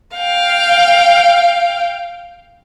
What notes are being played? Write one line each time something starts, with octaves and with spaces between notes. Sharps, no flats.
F5 G5